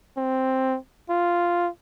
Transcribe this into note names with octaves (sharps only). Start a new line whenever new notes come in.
C4
F4